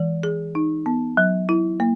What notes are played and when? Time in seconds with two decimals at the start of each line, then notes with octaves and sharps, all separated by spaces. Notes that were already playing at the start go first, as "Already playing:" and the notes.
Already playing: E3 G#3
0.23 G#4
0.55 D#4
0.86 B3
1.17 F#3
1.49 E4
1.80 A#3